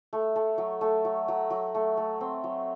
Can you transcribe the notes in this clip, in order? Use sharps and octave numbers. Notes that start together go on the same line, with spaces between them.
A3
A3
F#3
A3
F#3
F#3
F#3
A3
A3
C4
F#3